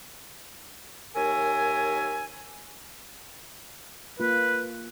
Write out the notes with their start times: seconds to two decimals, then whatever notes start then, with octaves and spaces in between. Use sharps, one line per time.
1.15 D#2 A#4 C#5 E5 G#5
4.20 A#3 F4 B4